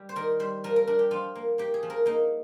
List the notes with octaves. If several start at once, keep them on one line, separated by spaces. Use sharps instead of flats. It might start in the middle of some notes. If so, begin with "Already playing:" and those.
Already playing: G3
C5
D#3 A#4
G3 C5
F3 A#4
A#4
D4 A#4
G4
F3 F4
A#3
A#3 G4
G#4
F3
A#4
A#3 D#4